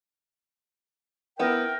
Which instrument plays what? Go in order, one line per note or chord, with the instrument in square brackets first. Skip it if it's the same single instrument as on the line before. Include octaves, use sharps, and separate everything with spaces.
[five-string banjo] B3 E4 [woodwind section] A#4 G5